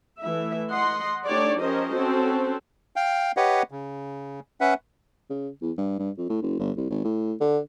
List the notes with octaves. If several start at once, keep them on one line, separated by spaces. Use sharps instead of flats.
E3 A3 E5
D#5 F#5 C6
A3 D4 D#4 G4 C#5 D5
F3 C#4 G4 A#4 C5 D#5
C4 C#4 F#4 A4 C5
F5 G5
G4 B4 C#5 D#5 F#5
C#3
C#4 B4 E5 F#5
C#3
E2
G2
G2
F2
A2
F#1
G1
C2
G#1
A2
D3